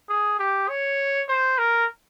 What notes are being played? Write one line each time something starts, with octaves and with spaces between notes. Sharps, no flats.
G#4
G4
C#5
C5
A#4